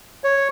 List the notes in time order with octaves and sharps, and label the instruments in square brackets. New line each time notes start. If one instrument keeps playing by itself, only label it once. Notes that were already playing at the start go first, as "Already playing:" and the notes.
[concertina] C#5